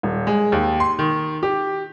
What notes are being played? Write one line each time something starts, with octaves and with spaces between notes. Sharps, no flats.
D#1
G#3
D#2
C6
D#3
G4